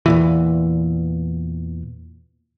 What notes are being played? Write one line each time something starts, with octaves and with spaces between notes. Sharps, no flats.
E2 A#2 E3